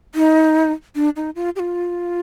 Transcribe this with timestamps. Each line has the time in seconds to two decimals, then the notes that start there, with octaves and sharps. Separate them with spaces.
0.15 D#4
0.96 D4
1.16 D#4
1.36 F4
1.56 G4
1.59 F4